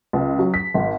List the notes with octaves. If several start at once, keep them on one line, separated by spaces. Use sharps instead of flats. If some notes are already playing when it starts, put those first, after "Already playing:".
C#2
F#3
B6
G#1